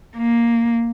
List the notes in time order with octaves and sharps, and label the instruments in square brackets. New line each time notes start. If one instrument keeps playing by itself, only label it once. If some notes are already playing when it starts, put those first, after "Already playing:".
[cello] A#3